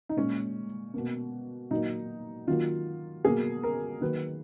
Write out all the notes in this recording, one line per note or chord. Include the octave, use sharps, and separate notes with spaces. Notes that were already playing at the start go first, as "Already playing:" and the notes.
D#4
A#2 G#3 C#4
B2 A#3
A#2 F#3 A#3 D#4
D#3 F#3 A#3 F4
B2 F#3 A#3 G#4
A#4
D#3 F#3 A#3 B4